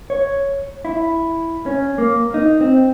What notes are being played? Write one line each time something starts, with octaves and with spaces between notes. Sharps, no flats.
C#5
E4
C#4
A#3
D#4
C4